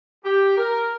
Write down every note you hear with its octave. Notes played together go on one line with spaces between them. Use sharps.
G4
A#4